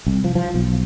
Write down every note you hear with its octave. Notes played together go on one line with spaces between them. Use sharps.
C2
F3
F3
B1